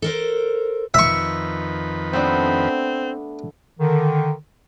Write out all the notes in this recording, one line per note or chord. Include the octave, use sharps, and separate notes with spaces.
A4 A#4 C5
F2 D#3 B4 E5 C#6
A3 B3 C4 D4
D3 D#3